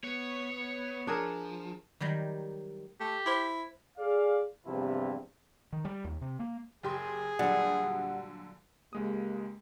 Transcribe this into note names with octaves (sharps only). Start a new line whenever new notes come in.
B3 C#5
F3 D4 G#4 A#4
D#3 F#3 G3
A3 G4
E4 C5 C6 D6
G#4 D5 F5
E2 G2 C3 E3 F3 E4
D#3
G3
D#2
C3
A#3
F#1 G4 G#4 C6
A#2 D3 F#3 G3 F#5
C#2 G#3 A#3 G4 D#6